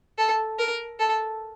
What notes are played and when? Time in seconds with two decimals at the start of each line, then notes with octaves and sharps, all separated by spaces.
0.18 A4
0.59 A#4
0.99 A4